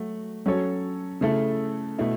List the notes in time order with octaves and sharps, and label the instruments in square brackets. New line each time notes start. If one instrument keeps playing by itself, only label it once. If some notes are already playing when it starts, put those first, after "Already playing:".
Already playing: [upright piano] F#3 A3 F#4
F#3 C#4 A4 C#5
C#3 A3 E4 A4
B2 A3 E4